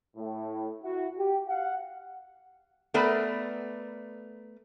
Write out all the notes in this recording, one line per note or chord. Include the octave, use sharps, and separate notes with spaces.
A2
E4 F#4
G4
F5 F#5
A3 B3 A#4 B4 D5